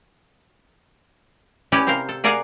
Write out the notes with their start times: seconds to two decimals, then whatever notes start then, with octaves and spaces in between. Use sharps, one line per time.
1.72 C#4 E4 G4 B4 C#5 D5
1.87 C3 C4 A#4 C5 F5
2.09 A4
2.24 G#4 A#4 D5 F5 F#5 G#5